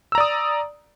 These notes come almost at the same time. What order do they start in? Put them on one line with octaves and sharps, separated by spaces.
E6 A#5 D5 D#6